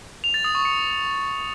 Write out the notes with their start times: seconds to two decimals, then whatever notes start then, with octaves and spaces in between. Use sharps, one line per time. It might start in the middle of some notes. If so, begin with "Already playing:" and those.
0.24 F7
0.34 A6
0.44 D#6
0.55 C#6
0.65 C#7